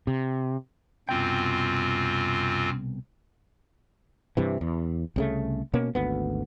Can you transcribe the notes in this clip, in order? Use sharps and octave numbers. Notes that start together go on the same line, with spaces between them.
C3
C2 F#2 B2 C4 F4 G5
G2 C3 E3
E2
C2 C#3 A3
B2 A#3 C#4
G#1 D2 B3